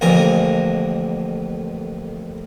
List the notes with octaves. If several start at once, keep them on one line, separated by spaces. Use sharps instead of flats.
A1 F2 D3 A#3 G#5 A#5